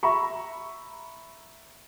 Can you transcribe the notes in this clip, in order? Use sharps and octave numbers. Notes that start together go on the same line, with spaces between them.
E5 A#5 B5 C#6